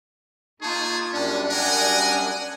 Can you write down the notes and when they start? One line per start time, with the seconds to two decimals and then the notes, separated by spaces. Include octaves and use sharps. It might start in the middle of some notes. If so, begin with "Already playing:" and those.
0.62 A#3 D#4 F4 G#4 A5 C#6
1.13 F#2 G3 C#4 D4
1.50 A#4 F#5 G#5 D#6